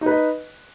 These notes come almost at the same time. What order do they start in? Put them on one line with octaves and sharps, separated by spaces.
D#4 B4 D#5